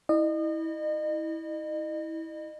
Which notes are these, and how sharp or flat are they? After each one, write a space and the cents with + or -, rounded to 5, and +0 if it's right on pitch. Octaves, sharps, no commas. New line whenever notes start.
E4 -25 D#5 -35